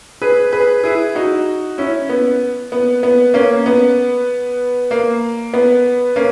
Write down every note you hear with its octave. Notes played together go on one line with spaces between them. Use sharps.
G#4 B4
G#4 B4
E4 G#4
D#4 F#4
C#4 E4
B3
B3
B3
A#3 C#4
B3
A#3
B3
A#3 C#4